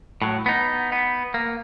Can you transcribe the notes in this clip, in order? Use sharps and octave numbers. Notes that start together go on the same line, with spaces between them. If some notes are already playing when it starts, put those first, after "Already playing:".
A2 F#3
B3 D#4
B3
A#3